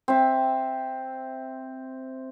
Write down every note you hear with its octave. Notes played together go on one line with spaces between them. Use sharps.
C4 E5